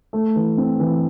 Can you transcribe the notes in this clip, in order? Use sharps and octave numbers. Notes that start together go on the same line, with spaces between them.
A3
E3
C4
E3